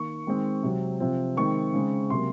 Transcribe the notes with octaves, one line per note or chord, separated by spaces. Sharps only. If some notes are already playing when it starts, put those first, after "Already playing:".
Already playing: D#3 A#3 C#6
D#3 G#3 C4
C3 F#3 C4
C3 F3 C4
D#3 G#3 C4 C#6
C#3 G#3 C4
C3 F#3 A#3 C6